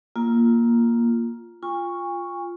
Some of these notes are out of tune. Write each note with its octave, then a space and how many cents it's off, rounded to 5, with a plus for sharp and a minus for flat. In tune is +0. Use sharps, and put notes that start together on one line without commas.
A#3 +5 F4 +0
F4 +0 G#5 -45 C#6 +0